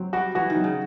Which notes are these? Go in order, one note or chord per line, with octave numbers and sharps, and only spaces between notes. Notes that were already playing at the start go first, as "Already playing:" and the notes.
Already playing: F#3 C4
G3 F#4
E3 F#4
D#3
F#3
C#3